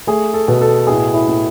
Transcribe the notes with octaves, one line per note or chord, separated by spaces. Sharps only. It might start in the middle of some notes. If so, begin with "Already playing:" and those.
A3 G#4
A4
B2
A4
A2 G#4
E4
A2